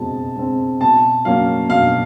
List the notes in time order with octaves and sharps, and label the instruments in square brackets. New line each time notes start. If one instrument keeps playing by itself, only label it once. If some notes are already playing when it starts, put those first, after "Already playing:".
Already playing: [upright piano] B2 G#3 C4 A5
G#3 C4
B2 A5
F#3 A#3 C#4 F5
B2 F5